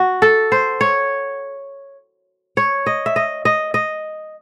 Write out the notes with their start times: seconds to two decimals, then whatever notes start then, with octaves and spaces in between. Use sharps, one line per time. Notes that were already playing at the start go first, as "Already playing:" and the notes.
Already playing: F#4
0.22 A4
0.52 C5
0.81 C#5
2.57 C#5
2.86 D#5
3.06 E5
3.16 D#5
3.45 D#5
3.74 D#5